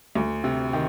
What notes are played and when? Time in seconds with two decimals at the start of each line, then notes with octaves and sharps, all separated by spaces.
0.15 D2
0.44 C3
0.73 D#3